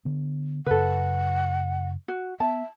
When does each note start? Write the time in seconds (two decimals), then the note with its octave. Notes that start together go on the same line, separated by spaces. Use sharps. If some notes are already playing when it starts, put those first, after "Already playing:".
0.05 D3 B3
0.66 F#2 C#3 A4 B4 F#5
2.08 F#4
2.40 B3 E5 A5